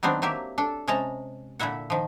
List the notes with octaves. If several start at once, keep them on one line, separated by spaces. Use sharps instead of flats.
D#3 F#3 B3 C4 D4
F#3 A#3 G4 E5
D4 A4
C3 G#3 C#4 A5 A#5
A#2 D3 E4 E5 F#5
D#3 F3